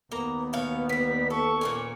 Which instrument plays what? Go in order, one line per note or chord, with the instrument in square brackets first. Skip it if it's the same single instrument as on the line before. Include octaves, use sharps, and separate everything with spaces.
[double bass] D#2 B3 [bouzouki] A#3 A#5
[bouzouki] B2 C#5 F5
[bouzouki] F#3 G3 [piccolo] B6
[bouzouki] A4 [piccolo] C#6
[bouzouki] A#2 A#3 C#4